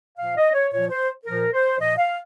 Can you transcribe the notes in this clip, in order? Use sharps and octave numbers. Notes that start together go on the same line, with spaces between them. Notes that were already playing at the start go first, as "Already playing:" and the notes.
A#2 F3 F5
D#5
C#5
A#2 F3 C#5
C5
A#2 F3 A#4
C5
A#2 F3 D#5
F5